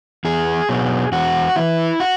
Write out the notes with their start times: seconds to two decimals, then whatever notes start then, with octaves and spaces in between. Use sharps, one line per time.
0.25 E2 G#4
0.69 B2 F#3
1.12 E2 F#4
1.56 E3 E4
2.00 F#4